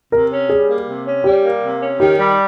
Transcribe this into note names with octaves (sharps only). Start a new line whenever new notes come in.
C3 A#4
C#4
G3 G#4
A#3
C3
C#4
G3 G4
A#3
C3
C#4
D#3 G4
G3